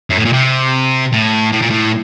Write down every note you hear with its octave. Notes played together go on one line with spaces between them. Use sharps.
F#2
A2
A#2
C3
A2
A2
A#2
A2